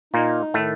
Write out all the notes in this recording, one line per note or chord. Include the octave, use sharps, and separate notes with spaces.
A#2 A#3 D#4
A2 D#3 A3